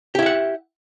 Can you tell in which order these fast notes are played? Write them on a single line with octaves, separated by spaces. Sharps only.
G4 E4 E5 F#5